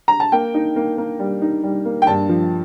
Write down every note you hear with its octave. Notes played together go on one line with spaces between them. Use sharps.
A#5
A5
A#3 G5
D#4
A#3
A#3
G3
D#4
G3
A#3
G5
G2 A5
F3